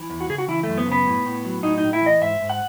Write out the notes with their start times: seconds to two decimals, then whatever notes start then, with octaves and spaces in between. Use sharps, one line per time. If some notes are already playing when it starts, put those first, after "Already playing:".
Already playing: E3
0.10 E2
0.20 F#4
0.30 C#3 G#4
0.38 F#4
0.48 E3 E4
0.63 A3
0.68 F#2
0.78 B3
0.86 C#3
0.91 B3
1.07 A2
1.25 A2
1.45 F#3
1.63 A2 D#4
1.78 D#4
1.84 A2
1.93 E4
2.01 E3 D#5
2.22 G#2 E5
2.40 G#2
2.50 F#5